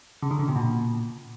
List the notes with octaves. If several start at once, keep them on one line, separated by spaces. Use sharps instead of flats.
C#3
D3
C#3
B2
A#2